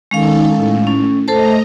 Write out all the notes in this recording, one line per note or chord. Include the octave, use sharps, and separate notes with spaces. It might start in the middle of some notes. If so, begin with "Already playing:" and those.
D#3 G#3 C#4 D#4 A4 F5
A2
C#4
A3 A4 C5 D#5 A5 A#5